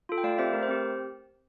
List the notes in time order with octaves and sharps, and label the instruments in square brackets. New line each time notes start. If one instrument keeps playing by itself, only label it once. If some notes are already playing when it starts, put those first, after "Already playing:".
[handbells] F4 A4
G5
A3 D5 F5
C4 G4 C5 E5
A3 A#4
C5
C4 G4